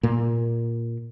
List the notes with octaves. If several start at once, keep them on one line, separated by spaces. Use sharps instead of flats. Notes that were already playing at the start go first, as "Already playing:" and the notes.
A#2 A#3